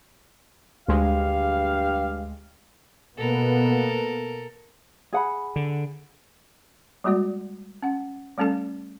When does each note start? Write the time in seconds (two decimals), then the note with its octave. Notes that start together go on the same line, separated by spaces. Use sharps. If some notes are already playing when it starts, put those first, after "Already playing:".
0.88 D2 G2 G#3 G4 F5
3.18 B2 A#3 B3 A4 A#4
5.13 G#4 F#5 B5
5.56 D3
7.04 G3 G#3 A#3 F#4 D5
7.83 C#4 F#5
8.38 G3 A3 C#4 A4 A5